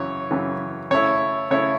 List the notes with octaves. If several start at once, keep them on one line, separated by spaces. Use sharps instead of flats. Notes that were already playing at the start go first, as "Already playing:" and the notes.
Already playing: F#2 C#3 E3 C#5
F#2 C#3 E3
C#3 A3 E4 C#5
C#3 A3 E4 C#5